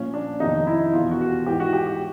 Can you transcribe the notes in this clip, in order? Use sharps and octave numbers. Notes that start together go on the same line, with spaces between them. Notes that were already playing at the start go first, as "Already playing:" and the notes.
Already playing: A#2 F3 C#4
D4
F2 C3 D#3 D#4
E4
E2 B2 F4
F#4
F#4
G4
G#2 E3 G4
F#4
G4
G4